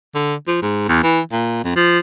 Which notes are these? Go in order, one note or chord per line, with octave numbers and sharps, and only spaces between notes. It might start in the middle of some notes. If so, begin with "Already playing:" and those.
D3
F3
G#2
E2
E3
A#2
F2
F3